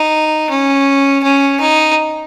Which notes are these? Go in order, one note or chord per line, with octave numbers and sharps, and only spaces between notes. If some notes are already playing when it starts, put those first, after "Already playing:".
Already playing: D#4
C#4
C#4
D#4